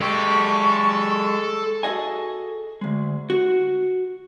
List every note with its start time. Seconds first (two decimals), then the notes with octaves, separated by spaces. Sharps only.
0.01 G#3 G4 A4 C#6
1.83 F#4 G#4 A4 D#5 G#5
2.81 D2 G#3
3.30 F#4